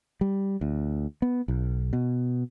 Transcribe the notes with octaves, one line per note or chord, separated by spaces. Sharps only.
G3
D2
B3
B1
B2